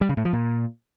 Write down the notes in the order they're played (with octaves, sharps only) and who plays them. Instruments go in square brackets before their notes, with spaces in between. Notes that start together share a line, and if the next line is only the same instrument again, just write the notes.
[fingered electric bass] G3
C#3
A2
F3
A#2